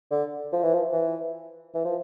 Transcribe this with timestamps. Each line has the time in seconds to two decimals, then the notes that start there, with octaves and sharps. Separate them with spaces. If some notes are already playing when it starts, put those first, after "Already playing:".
0.11 D3
0.53 F3
0.63 E3
0.74 F3
0.93 E3
1.74 E3
1.85 F3